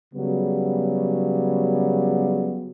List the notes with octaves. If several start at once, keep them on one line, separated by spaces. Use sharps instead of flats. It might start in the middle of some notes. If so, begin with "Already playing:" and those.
C#3 F#3 G3 B3